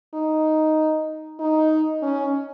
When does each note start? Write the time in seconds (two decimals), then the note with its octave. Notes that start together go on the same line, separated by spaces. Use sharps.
0.14 D#4
1.39 D#4
2.02 C#4